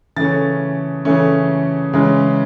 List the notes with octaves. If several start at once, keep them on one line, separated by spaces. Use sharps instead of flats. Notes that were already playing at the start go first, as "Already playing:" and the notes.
C#3 E3 A3 C#4 A6
C#3 E3 A3 C#4
C#3 E3 G#3 C#4